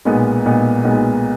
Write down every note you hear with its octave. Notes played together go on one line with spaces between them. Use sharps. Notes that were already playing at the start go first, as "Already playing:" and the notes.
B1 A#2 G#3 B3
B1 A#2 G#3 B3
B1 A#2 G#3 B3